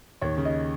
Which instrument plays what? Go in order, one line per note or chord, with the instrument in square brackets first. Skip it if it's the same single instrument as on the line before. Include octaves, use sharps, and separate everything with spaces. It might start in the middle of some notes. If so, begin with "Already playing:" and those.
[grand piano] D#2 C#5
C#3
D#5